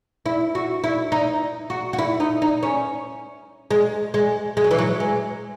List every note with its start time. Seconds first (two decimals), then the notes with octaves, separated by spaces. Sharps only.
0.26 E4
0.55 F#4
0.84 E4
1.12 D#4
1.70 F#4
1.93 F#4
1.99 E4
2.20 D#4
2.42 D#4
2.63 C#4
3.71 G#3
4.14 G#3
4.57 G#3
4.64 F#3
4.71 E3
4.78 F#3
5.00 G#3